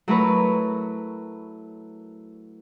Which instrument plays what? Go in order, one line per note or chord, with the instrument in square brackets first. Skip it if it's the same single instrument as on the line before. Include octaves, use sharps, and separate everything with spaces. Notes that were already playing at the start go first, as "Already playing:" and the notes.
[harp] F#3 A3 E4 A#4 B4 C#5